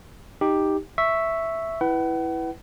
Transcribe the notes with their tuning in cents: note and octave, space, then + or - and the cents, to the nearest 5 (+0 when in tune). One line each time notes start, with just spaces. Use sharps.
D#4 +0 G4 +5
E5 +0 C#6 +0
E4 +0 B4 +0 F#5 +40